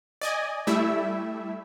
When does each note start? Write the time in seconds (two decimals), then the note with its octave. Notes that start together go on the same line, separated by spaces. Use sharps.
0.21 D5 D#5 G#5
0.67 G3 A3 E4 E5